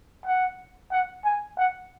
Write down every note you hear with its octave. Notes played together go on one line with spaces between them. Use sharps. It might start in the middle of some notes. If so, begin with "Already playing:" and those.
F#5
F#5
G#5
F#5